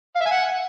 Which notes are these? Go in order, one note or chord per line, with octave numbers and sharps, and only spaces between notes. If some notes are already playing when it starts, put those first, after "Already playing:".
F5
E5
G#5
F#5